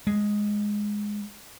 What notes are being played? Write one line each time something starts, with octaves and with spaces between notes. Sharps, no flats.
G#3